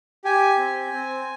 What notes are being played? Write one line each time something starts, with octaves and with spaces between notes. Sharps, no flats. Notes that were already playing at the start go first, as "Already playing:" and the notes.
G4 G#5
C4
C4